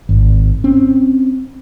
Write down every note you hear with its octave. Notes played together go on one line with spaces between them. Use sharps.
G#1
C4 C#4